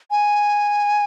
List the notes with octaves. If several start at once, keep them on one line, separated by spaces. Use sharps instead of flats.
G#5